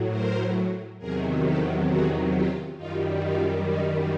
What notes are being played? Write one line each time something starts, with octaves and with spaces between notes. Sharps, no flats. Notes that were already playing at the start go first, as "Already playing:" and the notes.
Already playing: A2 F#3
A#4 C5
E2 C3 D#3 F#3 G#4 A#4
G4 A4
F#4 G#4
F4 G4
F#2 D#3 G3 D#4 F4
D#4 F4
C#4 D#4